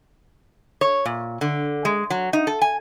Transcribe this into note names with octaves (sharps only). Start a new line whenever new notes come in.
C#5
A#2
D3
G#3
F#3
D#4
A4
G#5